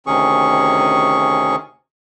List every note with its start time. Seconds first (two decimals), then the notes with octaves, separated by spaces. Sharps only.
0.07 D2 C3 D#3 C#4 G#4 C#6